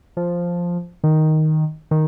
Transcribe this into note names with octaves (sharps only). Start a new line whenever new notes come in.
F3
D#3
D#3